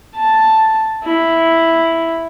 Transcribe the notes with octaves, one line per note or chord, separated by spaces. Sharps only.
A5
E4